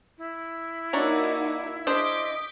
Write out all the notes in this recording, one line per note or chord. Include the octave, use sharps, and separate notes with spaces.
E4
A#3 D4 D#4 F#4 C#5 A#5
D4 G#4 C5 D#5 D6 G6 B6